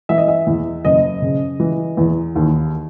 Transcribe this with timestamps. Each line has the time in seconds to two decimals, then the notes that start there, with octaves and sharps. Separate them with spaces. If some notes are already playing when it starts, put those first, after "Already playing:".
0.09 E3 E5
0.18 D#5
0.28 E5
0.47 E2
0.85 F#1 D#5
1.22 C#3
1.60 E3
1.97 E2
2.35 D#2